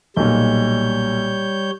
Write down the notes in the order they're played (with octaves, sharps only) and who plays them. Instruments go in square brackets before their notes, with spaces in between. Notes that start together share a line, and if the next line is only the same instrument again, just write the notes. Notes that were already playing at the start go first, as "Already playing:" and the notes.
[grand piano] B1 A#2 [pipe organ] G3 C#5 G6